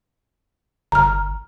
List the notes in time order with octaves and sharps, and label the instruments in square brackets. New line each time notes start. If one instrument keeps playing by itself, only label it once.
[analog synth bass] G1 [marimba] A#5 F6